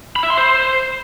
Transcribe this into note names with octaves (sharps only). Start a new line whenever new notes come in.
B5
E5
C6
C5